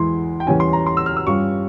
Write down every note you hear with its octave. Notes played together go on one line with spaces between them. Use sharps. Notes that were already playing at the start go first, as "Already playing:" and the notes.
Already playing: E2 E3 G#3 E4 C6
G5
E2 E3 G3 C#4 E4 G#5
C6
A#5
C6
E6
F6
E6
G2 G3 C#4 F4 C#6